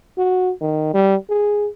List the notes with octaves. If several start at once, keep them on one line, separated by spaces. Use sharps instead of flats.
F#4
D#3
G3
G#4